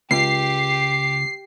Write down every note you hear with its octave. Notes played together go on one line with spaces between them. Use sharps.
C#2 G4 C7